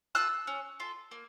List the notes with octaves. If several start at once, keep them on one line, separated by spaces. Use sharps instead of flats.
F4 A4 E6 F#6
C#4
F4 A4
A#3